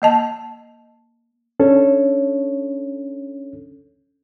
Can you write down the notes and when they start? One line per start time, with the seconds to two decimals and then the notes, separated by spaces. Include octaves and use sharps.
0.02 A#3 D#5 A5
1.60 C#4 D4 A4 C#5